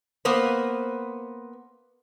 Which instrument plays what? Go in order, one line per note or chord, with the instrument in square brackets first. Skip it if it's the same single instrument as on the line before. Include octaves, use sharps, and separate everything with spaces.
[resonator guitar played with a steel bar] A#3 B3 B4 C5